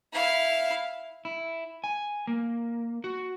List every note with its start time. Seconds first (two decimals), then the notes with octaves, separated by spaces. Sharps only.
0.13 E4 F5
1.25 E4
1.84 G#5
2.27 A#3
3.04 F#4